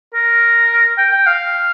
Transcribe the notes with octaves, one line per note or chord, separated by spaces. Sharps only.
A#4
G5
G5
F5